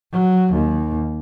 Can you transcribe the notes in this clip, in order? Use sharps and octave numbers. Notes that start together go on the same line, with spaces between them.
F#3
D#2